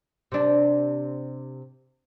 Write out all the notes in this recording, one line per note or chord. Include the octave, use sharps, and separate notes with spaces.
C3 D4